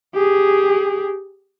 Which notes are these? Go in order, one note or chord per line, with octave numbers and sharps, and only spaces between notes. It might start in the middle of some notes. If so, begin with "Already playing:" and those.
G4 G#4